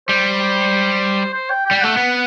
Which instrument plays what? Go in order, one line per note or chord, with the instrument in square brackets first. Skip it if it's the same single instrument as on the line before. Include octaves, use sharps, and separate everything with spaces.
[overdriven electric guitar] G3 [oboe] C5
[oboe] C5
G5
G5
[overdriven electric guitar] G3
[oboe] G5
[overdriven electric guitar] A3 [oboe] F#5
[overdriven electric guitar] B3